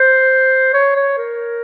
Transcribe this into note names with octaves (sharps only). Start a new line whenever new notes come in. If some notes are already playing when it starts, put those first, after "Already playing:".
Already playing: C5
C#5
C#5
A#4